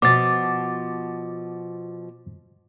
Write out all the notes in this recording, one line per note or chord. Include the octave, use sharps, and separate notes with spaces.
B2 F3 D6 A6